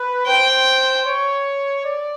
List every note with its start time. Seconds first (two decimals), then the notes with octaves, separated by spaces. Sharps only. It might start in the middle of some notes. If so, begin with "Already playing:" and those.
Already playing: B4
0.26 C5 G5
1.06 C#5
1.85 D5